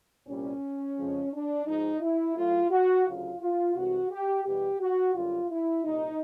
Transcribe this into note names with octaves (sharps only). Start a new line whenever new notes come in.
C2 A#2 G3 C#4
F2 C#3 F3 G#3
D4
G#2 F3 G#3 D#4
E4
A2 F#3 F4
F#4
D2 C#3 F#3 F4
F4
C2 C3 E3 G#3 F#4
G4
E2 B2 G3 G4
F#4
F#2 D3 G3 F4
E4
C2 A#2 G3 D#4